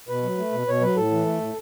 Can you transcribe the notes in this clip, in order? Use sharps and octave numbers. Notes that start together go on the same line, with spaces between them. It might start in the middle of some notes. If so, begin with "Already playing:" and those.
B2 B4
F#3
A3
B2
B2 C#5
F#3 B4
A2 A4
E3
A3
A2